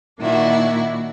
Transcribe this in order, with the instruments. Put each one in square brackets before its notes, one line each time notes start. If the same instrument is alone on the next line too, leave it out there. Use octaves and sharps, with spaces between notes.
[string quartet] A#2 D#3 D4 E4 F#4